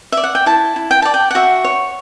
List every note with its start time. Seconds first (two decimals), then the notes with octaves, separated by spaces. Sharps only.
0.12 D5 E5
0.23 F#5
0.35 G5
0.46 E4 A5
0.76 E4
0.91 G5
1.02 D5 A5
1.14 G5
1.31 F#5
1.35 F#4 E5
1.64 C#5